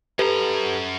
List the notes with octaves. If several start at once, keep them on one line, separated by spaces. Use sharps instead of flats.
F#2 G4 A4 B4 A#5